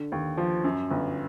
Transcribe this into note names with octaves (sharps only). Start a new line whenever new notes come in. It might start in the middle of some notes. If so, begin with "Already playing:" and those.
Already playing: D3
D#2
F3
F#2
G1